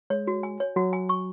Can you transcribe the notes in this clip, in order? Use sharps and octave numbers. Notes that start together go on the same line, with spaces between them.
G#3 C#5
F#4
G#5
C#5
F#3 F#4
G#5
C#6